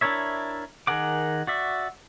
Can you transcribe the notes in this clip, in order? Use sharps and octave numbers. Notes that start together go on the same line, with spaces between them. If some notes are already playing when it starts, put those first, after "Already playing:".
D4 E4 A#4 C#5 E5
D#3 G#4 A#4 F#5 D6
F#4 D5 E5